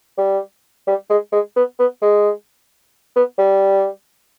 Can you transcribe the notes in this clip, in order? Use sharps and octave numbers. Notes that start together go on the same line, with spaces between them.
G3
G3
G#3
G#3
B3
B3
G#3
B3
G3